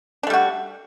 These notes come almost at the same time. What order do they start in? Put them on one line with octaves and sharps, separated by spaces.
D4 A3 G3 F#4